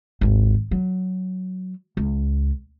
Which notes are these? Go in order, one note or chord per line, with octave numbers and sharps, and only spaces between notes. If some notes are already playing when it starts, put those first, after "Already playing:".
G#1 D#2
F#3
C#2